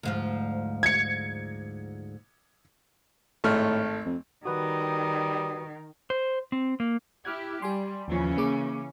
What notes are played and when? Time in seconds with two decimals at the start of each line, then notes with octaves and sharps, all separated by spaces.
0.03 D2 G#2 F3
0.83 G#6 C#7
3.44 G#1 A2 A3 F6
4.05 F2
4.45 D#3 G3 F#4 B4 D#6
6.10 C5
6.52 C4
6.80 A#3
7.25 E4 G4 F6 F#6 G#6
7.62 G3 G4 G#5 C6
8.08 D#2 C#3 E3 F3 C#4
8.37 A#3 G#4 D6